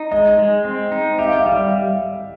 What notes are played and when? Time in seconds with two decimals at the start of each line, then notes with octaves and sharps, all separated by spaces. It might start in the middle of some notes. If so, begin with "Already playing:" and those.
Already playing: D#4
0.11 G#3 D#5
0.39 G#3
0.65 C4
0.92 D#4
1.19 G4 E5
1.28 F5
1.37 E5
1.46 G3 F5
1.55 E5